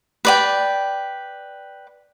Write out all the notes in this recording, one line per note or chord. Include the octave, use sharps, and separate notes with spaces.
B4 D5 G5